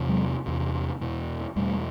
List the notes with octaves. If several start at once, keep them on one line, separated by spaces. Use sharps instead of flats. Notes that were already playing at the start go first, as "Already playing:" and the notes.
Already playing: E2 C3
F#3 G#3
E2 C3
E2 B2
E2 B2 G3 A3